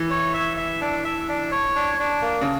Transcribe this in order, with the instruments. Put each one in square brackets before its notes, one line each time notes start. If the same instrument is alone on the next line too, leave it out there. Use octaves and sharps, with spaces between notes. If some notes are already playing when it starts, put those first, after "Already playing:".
Already playing: [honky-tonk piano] E3
[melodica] C#5
E5
E5
D4
E5
D4
C#5
D4
D4
A#3
[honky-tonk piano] C#3